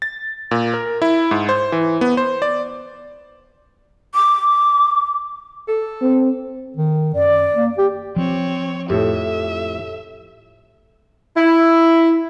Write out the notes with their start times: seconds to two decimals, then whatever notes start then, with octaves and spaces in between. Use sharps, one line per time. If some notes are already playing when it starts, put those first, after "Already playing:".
0.02 A6
0.51 A#2
0.74 A#4
1.02 E4
1.31 G#2
1.49 C5
1.72 E3
2.01 B3
2.17 C5
2.42 D5
4.15 D6
5.68 A4
6.02 C4
6.77 D#3
7.15 F#2 D5
7.55 A#3
7.78 G4
8.16 F3 C4 C#5
8.90 F2 A2 G4 A4 E5
11.37 E4